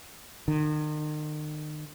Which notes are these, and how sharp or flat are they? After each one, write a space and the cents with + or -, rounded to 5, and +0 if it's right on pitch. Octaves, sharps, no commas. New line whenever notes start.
D#3 -40